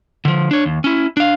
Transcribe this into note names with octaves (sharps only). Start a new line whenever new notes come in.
D3 F3
D4 C#5
D#2
C#4 E4
D4 F5